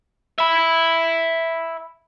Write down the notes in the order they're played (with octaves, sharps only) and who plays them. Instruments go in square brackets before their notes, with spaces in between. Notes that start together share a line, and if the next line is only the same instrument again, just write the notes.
[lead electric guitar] E5 B5